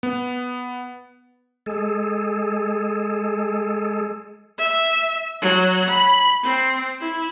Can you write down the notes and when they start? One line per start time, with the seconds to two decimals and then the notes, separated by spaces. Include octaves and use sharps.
0.03 B3
1.66 G#3 G#4 A4
4.59 E5
5.41 F#3
5.89 B5
6.43 C4
7.00 E4